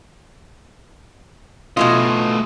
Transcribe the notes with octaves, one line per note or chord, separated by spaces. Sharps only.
B2 E3 A3 F4 D#5